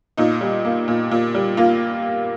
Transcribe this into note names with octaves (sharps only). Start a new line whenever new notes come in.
A#2 D#4
G3
A#3
A#2
A#2
G3
A#3 F4